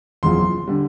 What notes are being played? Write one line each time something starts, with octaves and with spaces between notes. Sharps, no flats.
F#1 E2 C#3 F3 C6
D3 G3